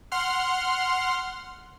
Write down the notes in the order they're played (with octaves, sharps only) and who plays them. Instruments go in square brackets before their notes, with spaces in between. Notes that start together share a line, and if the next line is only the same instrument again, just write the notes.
[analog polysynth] F#5 C6 F6